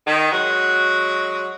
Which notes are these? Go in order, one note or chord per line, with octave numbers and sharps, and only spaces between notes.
D#3
F#3 G#3 F#4